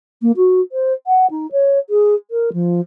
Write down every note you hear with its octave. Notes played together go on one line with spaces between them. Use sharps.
A#3
F#4
C5
F#5
D#4
C#5
G#4
A#4
F3